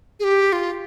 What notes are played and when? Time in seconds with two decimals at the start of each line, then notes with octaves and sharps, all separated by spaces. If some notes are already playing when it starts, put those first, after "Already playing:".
0.20 G#4
0.24 G4
0.53 F4